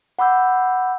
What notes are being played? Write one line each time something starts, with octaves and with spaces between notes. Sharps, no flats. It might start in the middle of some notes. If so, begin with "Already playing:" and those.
F#5 B5 D6 E6 G6